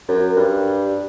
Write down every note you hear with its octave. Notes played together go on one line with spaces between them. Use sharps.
F#2
G2